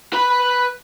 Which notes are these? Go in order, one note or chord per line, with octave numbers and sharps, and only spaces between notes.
B4 B5